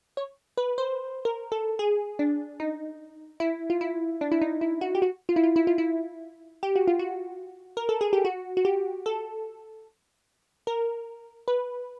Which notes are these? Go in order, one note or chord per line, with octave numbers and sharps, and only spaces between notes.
C#5
B4
C5
A#4
A4
G#4
D4
D#4
E4
F4
E4
D4
E4
D#4
E4
F#4
G4
F#4
F4
E4
F4
E4
F4
E4
G4
F#4
F4
F#4
A#4
A4
G#4
G4
F#4
F#4
G4
A4
A#4
B4